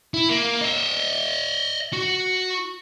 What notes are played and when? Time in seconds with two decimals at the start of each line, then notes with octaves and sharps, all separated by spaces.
0.14 E4
0.30 A#3
0.61 D#5 E5
1.93 F#4